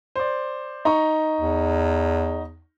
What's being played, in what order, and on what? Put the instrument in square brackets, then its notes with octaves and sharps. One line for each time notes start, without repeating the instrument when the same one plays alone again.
[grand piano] C5 D5
D#4 A#5 C#6
[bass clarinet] E2